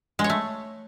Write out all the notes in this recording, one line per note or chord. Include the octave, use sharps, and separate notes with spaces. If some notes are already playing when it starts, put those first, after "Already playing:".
G#3
C#5
A3